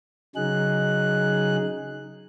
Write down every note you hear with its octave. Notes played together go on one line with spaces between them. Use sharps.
C#3 F#3 D#4 G#4 F#6